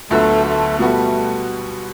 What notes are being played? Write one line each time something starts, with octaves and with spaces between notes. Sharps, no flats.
D2 D3 F#3 A3 B3
A3
B2 G3 A3 B3 F#4